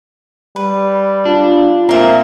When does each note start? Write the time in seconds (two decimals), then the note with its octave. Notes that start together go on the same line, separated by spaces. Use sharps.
0.56 G3 B4
1.25 D4 F4
1.89 A#2 A#3 C4 E5 A#5